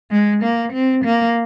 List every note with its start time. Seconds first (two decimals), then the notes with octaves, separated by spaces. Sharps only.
0.11 G#3
0.43 A#3
0.72 C4
1.04 A#3